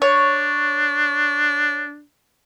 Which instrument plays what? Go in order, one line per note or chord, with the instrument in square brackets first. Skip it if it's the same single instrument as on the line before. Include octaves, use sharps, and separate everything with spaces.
[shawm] D4 [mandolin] C#5